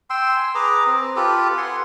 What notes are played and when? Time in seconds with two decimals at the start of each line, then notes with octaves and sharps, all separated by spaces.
0.10 G5 C6 E6
0.36 G#5
0.55 G#4 B4 A#5 D6
0.86 C4
1.16 F4 G4 A4 B4
1.57 F#5 G#5 C6